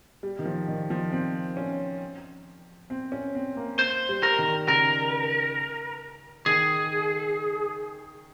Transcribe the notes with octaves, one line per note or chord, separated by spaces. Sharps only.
G3
D#3
F3
D#3
F3
C4
C#4
C4
C#4
C4
A#3
C5
G3
A#4
D#3
C#3 A#4
D#3 G#4